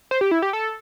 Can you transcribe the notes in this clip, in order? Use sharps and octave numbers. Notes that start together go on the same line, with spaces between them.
C5
G4
E4
G4
A4